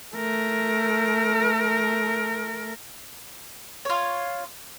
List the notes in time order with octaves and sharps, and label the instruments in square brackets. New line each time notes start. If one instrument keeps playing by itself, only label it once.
[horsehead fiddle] A3 A#4
[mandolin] F4 C#5